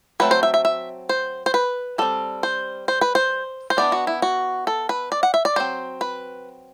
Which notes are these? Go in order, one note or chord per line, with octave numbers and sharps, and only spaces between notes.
F#3 A3 C4 B4
C5
E5
E5
E5
C5
C5
B4
G3 C4 A4
C5
C5
B4
C5
C5
E3 B3 D4 D5
F#4
E4
F#4
A4
B4
D5
F#5
E5
D5
F#3 C4 C5
B4